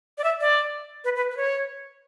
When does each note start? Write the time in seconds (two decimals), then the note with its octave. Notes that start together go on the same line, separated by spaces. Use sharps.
0.18 D5
0.24 E5
0.40 D5
1.04 B4
1.16 B4
1.31 B4
1.37 C#5